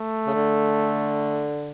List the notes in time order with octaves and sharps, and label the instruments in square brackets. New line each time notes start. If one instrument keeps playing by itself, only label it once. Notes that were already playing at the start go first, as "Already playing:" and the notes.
Already playing: [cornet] A3
[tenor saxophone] C#3
D3